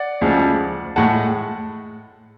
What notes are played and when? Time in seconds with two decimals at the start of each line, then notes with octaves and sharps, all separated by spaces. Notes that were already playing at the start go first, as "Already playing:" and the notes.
Already playing: D5 F#5
0.21 D2 C#3 F3 G#3
0.96 A2 G#3 F#5 A5